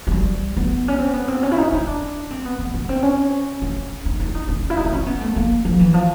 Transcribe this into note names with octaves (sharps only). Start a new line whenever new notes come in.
G#3
G3
B3
C#4
C4
B3
C4
C#4
E4
D#4
D#4
D4
C4
B3
B3
B3
C4
C#4
C#4
D#4
E4
D#4
C#4
E4
D#4
D4
C#4
B3
A3
A#3
F3
E3
F3